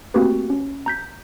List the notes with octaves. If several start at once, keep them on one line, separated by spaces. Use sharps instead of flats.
A3 A#3 C4 F#4 G4 B4
C#4
A#5 G6 B6